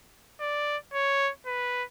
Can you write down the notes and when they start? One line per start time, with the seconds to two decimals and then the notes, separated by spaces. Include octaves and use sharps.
0.40 D5
0.94 C#5
1.46 B4